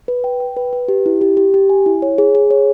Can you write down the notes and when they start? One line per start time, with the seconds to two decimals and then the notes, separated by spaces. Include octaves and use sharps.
0.08 B4
0.24 G5
0.40 G5
0.57 B4
0.73 B4
0.88 G4
1.06 E4
1.21 G4
1.37 G4
1.54 G4
1.69 G#5
1.86 E4
2.02 C#5
2.18 G#4
2.35 G#4
2.51 C#5